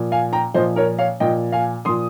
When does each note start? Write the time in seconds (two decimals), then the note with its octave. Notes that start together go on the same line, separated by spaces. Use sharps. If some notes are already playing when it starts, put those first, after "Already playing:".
Already playing: A#2 F3
0.12 F5 G#5
0.33 G5 A#5
0.54 A#2 F3 C5 D#5
0.76 A#4 C#5
0.99 C#5 F5
1.20 A#2 F3 D#5 G5
1.52 F5 G#5
1.85 A#2 F3 C6 D#6